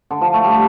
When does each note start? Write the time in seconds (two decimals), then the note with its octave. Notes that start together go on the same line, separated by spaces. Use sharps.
0.10 D3
0.21 F3
0.34 A3
0.45 G3